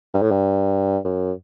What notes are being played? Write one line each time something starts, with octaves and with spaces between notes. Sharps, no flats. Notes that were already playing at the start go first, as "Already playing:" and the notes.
G2
A2
G2
F#2